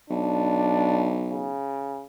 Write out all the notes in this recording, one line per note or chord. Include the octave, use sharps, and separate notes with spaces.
B1 D4
C#3